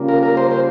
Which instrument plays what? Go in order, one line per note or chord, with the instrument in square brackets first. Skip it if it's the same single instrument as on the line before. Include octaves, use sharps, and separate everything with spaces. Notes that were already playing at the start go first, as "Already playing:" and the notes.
Already playing: [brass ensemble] C#3 G3 A#3 C#4 F4
[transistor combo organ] A#4
A#4
C5
C5